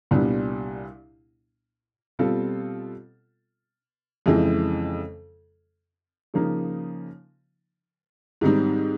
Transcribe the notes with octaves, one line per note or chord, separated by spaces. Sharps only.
C2 A#2 G3 B3 D4
B2 G3 C4 F4 A4
F2 C#3 E3 G#3 C4
C#3 F3 A#3 D#4
G#2 D#3 G3 C4 D#4